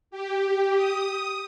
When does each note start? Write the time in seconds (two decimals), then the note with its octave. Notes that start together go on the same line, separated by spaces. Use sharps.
0.11 G4
0.76 D#6